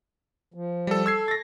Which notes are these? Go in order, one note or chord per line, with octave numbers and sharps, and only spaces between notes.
F3
G3 A4
A4 E6 G#6 C7
A6 A#6